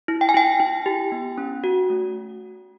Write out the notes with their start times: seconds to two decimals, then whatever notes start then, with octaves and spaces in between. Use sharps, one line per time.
0.08 E4
0.21 G5
0.29 G#5
0.34 E4 G5
0.60 E4
0.86 G4
1.12 B3
1.38 C#4
1.64 F#4
1.90 A3